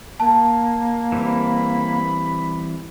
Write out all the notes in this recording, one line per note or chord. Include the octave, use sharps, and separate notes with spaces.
A#3 A5
E3 G3 C4 B5